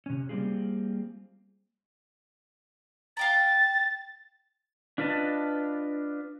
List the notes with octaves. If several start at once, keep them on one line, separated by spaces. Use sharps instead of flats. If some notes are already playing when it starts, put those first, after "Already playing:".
C3 C#4
G3 A#3 C4 F4 G#4
F5 G5 A#5 A6
D4 F4 B4 D#5 A5